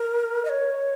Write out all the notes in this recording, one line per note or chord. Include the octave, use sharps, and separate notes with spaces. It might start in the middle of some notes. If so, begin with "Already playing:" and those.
Already playing: A#4
D#5
C#5